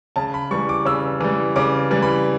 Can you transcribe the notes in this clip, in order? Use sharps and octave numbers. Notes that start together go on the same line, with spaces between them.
C#3 A5
B5
E3 G3 C#6
D6
C#3 E6
E3 G3
C#3 D6
E3 G3
B5